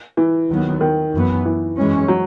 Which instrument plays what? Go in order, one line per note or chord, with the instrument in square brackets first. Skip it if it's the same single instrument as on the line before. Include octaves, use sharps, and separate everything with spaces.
[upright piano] E3
[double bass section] D#2 D#3 F#3 B3
[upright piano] D#3
[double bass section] F#2 E3 B3
[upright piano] E3
[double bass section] F#2 E3 G#3 C#4
[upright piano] F#3